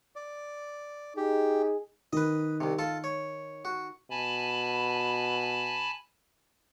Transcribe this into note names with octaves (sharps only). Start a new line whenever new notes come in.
D5
D#4 G4 G#4
D#3 B4 D#5
C2 C3
F4 A4 A5
C#5
F#4
B2 G#5 A5 B5